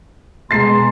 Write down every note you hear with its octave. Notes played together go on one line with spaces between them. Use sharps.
B2 G#3 A5 A#5 C6 A6 C7